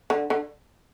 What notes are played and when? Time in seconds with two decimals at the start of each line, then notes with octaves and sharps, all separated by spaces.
0.10 D3
0.30 D3